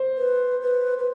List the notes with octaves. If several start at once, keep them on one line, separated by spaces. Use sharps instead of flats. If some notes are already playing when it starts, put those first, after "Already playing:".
Already playing: C5
B4
B4
B4